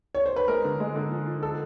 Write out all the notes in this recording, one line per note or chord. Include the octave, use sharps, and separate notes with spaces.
C#5
C5
B4
G#3 A#4
D3
G#3
D3
F3
F3
A4